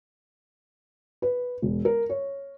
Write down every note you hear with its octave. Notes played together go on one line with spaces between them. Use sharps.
B4
E1
A#4
C#5